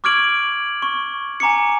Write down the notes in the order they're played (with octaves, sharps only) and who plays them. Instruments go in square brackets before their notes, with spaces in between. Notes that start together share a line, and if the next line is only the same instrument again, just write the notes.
[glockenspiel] C#6 D6 F6 G#6 D7 F#7
C#6
G#5 A#5 D6 C#7